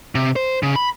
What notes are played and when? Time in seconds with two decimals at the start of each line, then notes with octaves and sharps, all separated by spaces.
0.15 C3
0.36 C5
0.63 C#3
0.76 B5